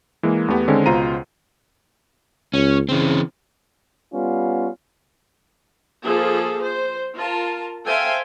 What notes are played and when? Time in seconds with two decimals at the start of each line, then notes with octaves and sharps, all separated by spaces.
0.23 E3 G#3 A#3
0.48 E2 A3 B3 G4
0.68 D3 D#3 G#3 C4 C#4
0.86 C#2 B2 F4 C5 A#5 D#7
2.54 C#2 C#4
2.89 C#3 E3 C4
4.12 G3 B3 C#4 F4
6.05 F3 A#3 F4 G#4 A4
6.64 C5
7.16 F4 A#4 A5
7.85 A4 C5 E5 F5 G5 G#5